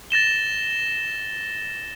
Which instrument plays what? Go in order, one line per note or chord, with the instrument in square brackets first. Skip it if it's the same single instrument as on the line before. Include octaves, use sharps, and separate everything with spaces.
[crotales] A6 A#6 E7 G7